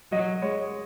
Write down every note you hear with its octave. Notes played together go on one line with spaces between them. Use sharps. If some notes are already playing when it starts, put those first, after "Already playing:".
F#3 D#5
G#3 C#5